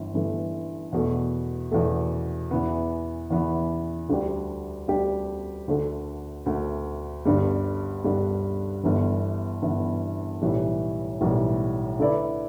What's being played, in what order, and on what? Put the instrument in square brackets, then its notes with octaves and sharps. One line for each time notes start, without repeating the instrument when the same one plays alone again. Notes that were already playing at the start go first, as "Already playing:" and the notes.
Already playing: [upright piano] G1 G2 E3
G1 G2 E3 A3
E2 B2 A3
E2 B2 A3
E2 E3 B3
E2 E3 B3
D2 D3 G3 D4 G4
D2 D3 G3 D4 G4
D2 D3 A3
D2 D3 A3
G1 G2 D3 G3
G1 G2 D3 G3
G1 G2 E3 B3
G1 G2 E3 B3
B1 A2 E3 G3
B1 A2 E3 G3
D3 A3 E4 B4 D5